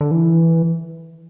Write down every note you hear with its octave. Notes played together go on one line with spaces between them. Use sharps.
D3
E3